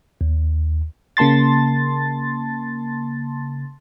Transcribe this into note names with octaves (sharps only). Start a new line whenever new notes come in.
D#2
C#3 A#3 A5 C6 A6